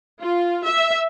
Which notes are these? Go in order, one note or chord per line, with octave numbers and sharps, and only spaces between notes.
F4
E5